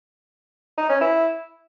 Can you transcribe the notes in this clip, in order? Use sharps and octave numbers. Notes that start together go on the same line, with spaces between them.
D#4
C#4
E4